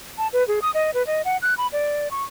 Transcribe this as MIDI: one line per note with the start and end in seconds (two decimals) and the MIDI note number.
0.18 0.28 81
0.33 0.46 71
0.48 0.60 68
0.62 0.71 87
0.74 0.91 75
0.94 1.05 71
1.07 1.22 75
1.25 1.37 78
1.42 1.54 90
1.58 1.67 83
1.73 2.08 74
2.11 2.24 85